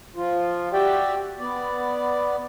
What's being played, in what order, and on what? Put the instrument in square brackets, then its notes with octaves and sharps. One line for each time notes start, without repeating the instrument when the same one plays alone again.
[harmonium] F3 F4
F#4 G4 D5 E5 G5
B3 D5